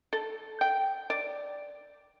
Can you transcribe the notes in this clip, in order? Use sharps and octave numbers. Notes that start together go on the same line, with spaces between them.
A4
G5
D5